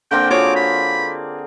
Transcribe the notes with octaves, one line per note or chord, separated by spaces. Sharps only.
D3 A#3 C4 G5
F4 F#4 G#4 C#5 D6
B5